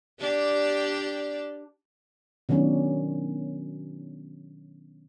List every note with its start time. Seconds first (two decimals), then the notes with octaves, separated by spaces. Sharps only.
0.20 D4 G4 D5
2.49 B2 D#3 F#3 C#4 D4